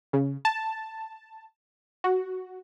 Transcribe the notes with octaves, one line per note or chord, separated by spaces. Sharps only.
C#3
A5
F#4